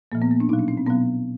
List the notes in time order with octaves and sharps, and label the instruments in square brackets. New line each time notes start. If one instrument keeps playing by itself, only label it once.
[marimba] A#2 F3 A#3
B3
A#3
D4
B2 F#3 D#4
D4
C#4
C4
B2 F#3 B3